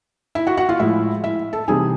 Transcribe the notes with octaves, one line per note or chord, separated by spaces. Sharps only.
E4 E5
F#4 F#5
F#4 F#5
F4 F5
A2 F3 G#3 E4 E5
E4 E5
A4 A5
C3 E3 G3 C4 D#4 G#4 G#5